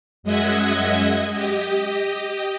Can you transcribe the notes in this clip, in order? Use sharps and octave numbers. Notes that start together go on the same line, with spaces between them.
F#2 G#3 D#5 E5 F#5 G#6
G4 D#5